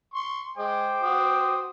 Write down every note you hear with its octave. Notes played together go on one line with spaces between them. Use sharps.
C6 C#6
G#3 C5 G5 D6
F#4 D#6